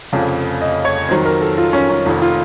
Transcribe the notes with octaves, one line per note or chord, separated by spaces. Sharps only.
F1 F2 C#3
D#5
C#5
F2 D#3 F#3 C5
A#4
A4
F4
C#4
C#4
F1 F2 D#3
F4